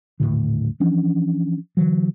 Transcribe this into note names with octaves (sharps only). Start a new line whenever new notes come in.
D#1 B1 A2 D3
E3 F3 C#4 D4
D3 E3 F#3